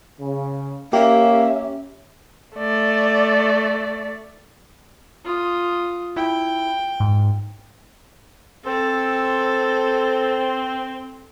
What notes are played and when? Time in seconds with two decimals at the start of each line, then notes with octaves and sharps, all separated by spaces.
0.21 C#3
0.93 A#3 C#4 G4 E5
2.57 A3 D5
5.25 F4 D#6
6.16 E4 G5
7.00 G#2
8.66 C4 A4